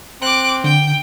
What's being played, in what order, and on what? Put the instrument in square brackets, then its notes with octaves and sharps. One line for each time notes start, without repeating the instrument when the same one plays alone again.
[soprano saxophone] C4 [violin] D6 F#6
[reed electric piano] D3 [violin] G5